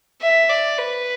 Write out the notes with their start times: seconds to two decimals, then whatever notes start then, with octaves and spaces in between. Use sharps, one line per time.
0.22 E5
0.50 D5
0.78 B4